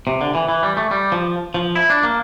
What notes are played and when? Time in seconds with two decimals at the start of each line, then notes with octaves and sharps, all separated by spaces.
0.07 C3
0.21 D3
0.35 E3
0.49 E3
0.63 G3
0.77 A3
0.91 G3
1.12 F3
1.54 F3
1.75 E4
1.90 D4
2.03 A#3